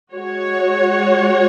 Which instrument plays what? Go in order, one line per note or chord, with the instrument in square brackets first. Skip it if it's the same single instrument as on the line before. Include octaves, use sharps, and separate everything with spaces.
[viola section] G#3 F#4 C#5